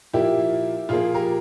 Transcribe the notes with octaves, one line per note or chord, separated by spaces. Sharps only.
A#2 F3 A#3 E4 G4
A#2 F3 A#3 F4 G#4
G4 A#4